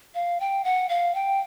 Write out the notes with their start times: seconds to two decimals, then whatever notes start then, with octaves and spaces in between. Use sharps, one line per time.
0.15 F5
0.40 G5
0.64 F#5
0.89 F5
1.15 G5